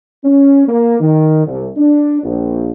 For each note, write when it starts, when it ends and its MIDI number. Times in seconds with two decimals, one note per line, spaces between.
0.24 0.66 61
0.67 0.98 58
1.00 1.44 51
1.46 1.68 36
1.77 2.22 62
2.23 2.71 34